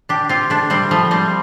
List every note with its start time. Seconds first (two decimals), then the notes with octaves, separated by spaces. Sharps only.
0.09 D4 G4
0.29 C4 F4
0.50 A3 D4
0.70 G3 C4
0.91 F3 A3
1.11 G3 C4